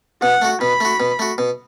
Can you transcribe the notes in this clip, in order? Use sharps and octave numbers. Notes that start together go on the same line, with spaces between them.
B2 F#5
A3 F#4
B2 B5
A3 F#4
B2
A3 F#4
B2